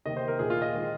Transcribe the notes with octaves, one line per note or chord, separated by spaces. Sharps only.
C3 D#3 A#3 D#5
C5
A#4
A#2 A#3 G#4
F4
D#5
D#3 G#3